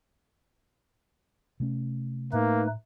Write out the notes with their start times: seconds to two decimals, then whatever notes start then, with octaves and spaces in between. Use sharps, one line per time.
1.60 C3 A3 C#4
2.33 A2 A3 A#3 D#4 B4